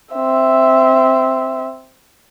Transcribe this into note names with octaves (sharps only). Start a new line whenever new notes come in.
C4 E5